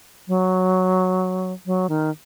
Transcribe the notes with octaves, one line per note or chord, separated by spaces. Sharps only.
F#3
F#3
D#3